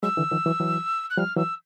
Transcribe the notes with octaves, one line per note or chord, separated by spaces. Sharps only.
F#3 G#3 E6
D3 E3
D#3 F3
E3 F#3
E3 F#3
F#6
F3 G3 F6
E3 F#3 E6